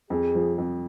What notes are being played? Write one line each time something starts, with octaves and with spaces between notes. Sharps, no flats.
F2 G#4
F3
F2